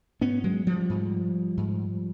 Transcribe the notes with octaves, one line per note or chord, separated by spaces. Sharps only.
G#2 B3 C#4
F#3 G#3
F3 G3
G#2
G#2